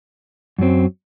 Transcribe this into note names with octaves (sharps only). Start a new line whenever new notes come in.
F#2 F#3 C4